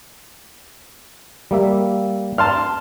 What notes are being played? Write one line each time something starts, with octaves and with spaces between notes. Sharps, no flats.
G3 A#3 E5
A5 C6 F6